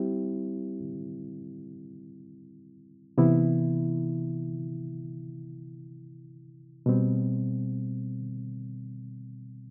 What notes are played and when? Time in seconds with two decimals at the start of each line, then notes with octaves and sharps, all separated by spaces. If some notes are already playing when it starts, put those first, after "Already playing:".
Already playing: G3 C4 E4 G4
3.18 C3 E3 B3 E4
6.86 B2 G3 C4